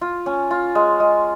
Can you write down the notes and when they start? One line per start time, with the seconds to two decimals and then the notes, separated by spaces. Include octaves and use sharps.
0.01 F4
0.26 C#4
0.51 F4
0.75 G#3
1.00 G#3